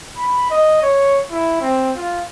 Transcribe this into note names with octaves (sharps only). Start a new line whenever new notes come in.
B5
D#5
C#5
E4
C4
F4